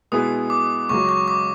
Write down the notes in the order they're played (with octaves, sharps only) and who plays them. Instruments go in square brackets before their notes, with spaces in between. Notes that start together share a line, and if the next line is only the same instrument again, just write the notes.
[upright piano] B2 G#3 B3 E4 G#4 [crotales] D#6
[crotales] D6
[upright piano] C#2 C#3 F#3 [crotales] C#6
[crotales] C#6
D6